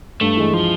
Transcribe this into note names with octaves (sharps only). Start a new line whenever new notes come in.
G2 A3
E3 G#3
F3